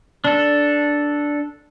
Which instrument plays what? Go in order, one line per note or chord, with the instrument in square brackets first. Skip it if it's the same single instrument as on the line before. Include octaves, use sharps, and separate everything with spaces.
[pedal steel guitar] D4 A4